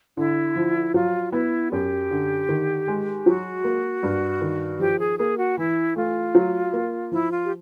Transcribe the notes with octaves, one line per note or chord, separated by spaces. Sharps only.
D3 E4
F3
F#3 F4
B3 E4
F#2 G4
D3
D#3
G#3
F#3 F#4
A#3
G2
D#3
F3 G4
G#4
A#3 G#4
F#4
E3 E4
A3 F4
F#3
A#3
F3 E4
F4
G4